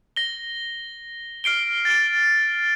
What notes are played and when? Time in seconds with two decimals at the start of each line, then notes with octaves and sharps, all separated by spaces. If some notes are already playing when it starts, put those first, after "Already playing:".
0.16 A#6 G7
1.44 F6 C7 D7 G7
1.85 A6 D7